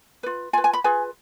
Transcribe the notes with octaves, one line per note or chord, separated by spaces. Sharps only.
F4 B4
F4 B4 G#5
G#5
B5
F4 G#4 B4 G#5